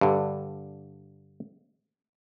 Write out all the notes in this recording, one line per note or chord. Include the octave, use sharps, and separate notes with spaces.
G2 D3